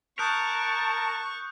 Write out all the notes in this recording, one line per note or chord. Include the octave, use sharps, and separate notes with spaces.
A#4 A5 C#6 D#6 F#6 G6